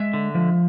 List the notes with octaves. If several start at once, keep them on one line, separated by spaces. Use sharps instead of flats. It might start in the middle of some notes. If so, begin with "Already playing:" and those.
Already playing: G#3 E5
D3
F3